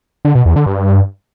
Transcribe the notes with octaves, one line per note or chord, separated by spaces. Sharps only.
D3
B2
E2
D3
G2